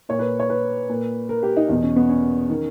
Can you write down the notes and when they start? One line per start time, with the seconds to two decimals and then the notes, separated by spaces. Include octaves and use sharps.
0.09 A#2 C#5
0.19 B4
0.40 C#5
0.50 B4
0.89 A#2
1.29 A#4
1.43 G4
1.57 D#4
1.69 E2 B2 D#4
1.83 C#4
1.96 B3
2.09 C#4
2.50 D#3